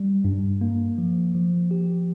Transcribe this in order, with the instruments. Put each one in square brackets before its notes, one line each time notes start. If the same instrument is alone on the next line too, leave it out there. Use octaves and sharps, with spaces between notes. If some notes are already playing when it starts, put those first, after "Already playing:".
Already playing: [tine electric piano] G3
G2
A#3
F3
F3
G4